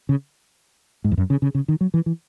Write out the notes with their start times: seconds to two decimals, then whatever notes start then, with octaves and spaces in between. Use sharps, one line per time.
0.09 C#3
1.04 G#2
1.12 E2
1.17 F#2
1.30 C#3
1.42 C#3
1.55 C#3
1.68 D#3
1.81 F#3
1.94 E3
2.06 E3